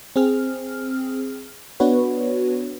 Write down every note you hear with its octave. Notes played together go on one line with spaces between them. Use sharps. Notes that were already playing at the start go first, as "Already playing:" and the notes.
C4 G#4 F6
B3 D4 F#4 B4 C#5